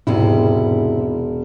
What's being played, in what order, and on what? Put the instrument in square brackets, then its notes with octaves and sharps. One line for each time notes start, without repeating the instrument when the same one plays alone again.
[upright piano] E1 [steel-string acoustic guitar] G#2 C3 E4